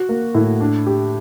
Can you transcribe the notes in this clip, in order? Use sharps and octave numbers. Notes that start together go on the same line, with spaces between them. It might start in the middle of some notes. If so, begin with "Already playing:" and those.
Already playing: F#4
A#3
A2
D4
G4